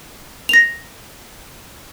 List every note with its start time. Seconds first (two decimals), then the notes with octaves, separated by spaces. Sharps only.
0.49 A#6 F7